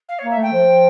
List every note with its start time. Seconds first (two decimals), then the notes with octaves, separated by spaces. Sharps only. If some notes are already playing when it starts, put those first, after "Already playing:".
0.08 F5
0.18 C#5
0.23 A#3
0.30 E5
0.38 A3 G5
0.53 F3